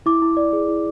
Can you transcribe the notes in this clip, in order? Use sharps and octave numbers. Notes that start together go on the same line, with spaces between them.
E4 D6
E4
D5
G#4
E4